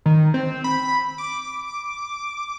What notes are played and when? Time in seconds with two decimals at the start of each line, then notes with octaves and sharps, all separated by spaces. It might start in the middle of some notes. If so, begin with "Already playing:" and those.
0.06 D#3
0.34 C4
0.64 B5
1.18 D6